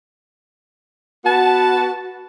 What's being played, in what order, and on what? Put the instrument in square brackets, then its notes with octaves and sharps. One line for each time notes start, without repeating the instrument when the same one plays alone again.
[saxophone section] B3 F#4 [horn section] B4 F#5 A5